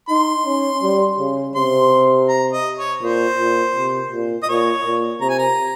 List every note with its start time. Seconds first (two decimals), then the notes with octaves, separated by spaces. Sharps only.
0.09 D#4 C6
0.45 C#4
0.82 G3
1.19 C#3
1.55 C3 C6
2.29 A#5
2.53 D#5
2.78 C#5
3.02 A#2 C5
3.38 A#2
3.75 C3
4.11 A#2
4.43 D#5
4.48 A#2 C#5
4.85 A#2
5.21 C3 A#5
5.29 G#5
5.39 A#5